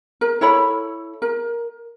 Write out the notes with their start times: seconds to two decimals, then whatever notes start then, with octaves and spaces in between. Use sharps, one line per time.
0.21 A#4
0.41 E4 A4 C#5 B5
1.22 A#4